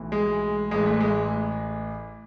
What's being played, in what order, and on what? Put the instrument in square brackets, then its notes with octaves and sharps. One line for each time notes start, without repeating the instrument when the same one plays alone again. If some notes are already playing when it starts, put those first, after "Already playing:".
Already playing: [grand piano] B1 A2 E3
G#3
A1 A2 E3 G#3
A3
G#3